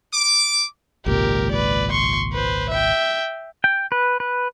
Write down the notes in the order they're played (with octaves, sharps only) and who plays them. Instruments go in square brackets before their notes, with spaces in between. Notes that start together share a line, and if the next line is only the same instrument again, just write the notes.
[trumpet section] D6
[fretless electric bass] G#1 C#2 A#2 [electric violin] G4 A#4
[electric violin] B4 D5
C6 C#6
B4 C5
E5 G5
[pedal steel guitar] G5
B4
B4